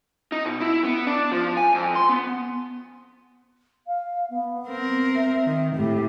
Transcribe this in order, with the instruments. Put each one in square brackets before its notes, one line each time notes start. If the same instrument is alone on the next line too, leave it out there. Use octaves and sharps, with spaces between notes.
[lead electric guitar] D#4
B2
E4
B3
D4
F3
G#5
F2
C6
B3
[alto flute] F5
B3
[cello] C4 A#4
[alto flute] E5
[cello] D#3
[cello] A2 [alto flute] G4